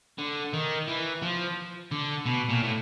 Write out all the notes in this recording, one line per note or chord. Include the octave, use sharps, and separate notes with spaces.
D3
D#3
E3
F3
D3
B2
A#2
A2